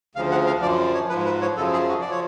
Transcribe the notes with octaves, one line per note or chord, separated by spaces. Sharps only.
D2 C#3 F3 F5
F#5
F5
F#2 F3 D5
C#5
G#2 F3 B4
B4
C#5
F#2 C#3 F3 A4
G#4
F#4
D5
F3 C#5